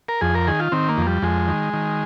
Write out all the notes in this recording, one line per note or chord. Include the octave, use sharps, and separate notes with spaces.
A#4
F2 G#4
A#4
D#3 G#4
F4
D#3 C4
A#3
F2
G3
F2 G#3
D#3
D#3